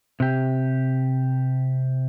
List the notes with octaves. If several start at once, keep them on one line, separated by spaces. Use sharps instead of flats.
C3 G4